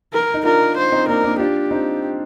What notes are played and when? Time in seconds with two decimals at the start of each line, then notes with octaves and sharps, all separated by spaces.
0.13 A#4
0.34 D#4
0.45 D4 F4 A#4
0.77 C5
0.92 C4 D#4
1.08 A#3 D4 A#4
1.24 A#3 D4
1.40 D4 F4 G4
1.71 C4 D#4